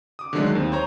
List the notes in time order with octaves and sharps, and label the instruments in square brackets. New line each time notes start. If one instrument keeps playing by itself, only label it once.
[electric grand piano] D6 D#6
D3 D#3 F#3 G#3 A3 D4
D#2 C4
C5 C#5 A#5